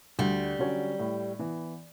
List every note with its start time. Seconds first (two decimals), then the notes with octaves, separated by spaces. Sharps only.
0.19 D2 G3
0.59 D3 F#3 C#4
0.99 A2
1.39 E3 B3